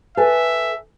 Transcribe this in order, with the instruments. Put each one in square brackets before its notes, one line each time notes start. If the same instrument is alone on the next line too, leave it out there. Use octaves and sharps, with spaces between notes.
[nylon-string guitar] A4 B4 G#5 [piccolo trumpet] E5